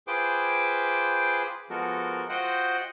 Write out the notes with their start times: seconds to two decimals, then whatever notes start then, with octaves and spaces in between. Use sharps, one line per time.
0.07 F4 G#4 B4 C5 G5 D6
1.70 F3 G#3 B3 F#4 A4 A#4
2.29 F4 F#4 C5 D#5 F#5 G5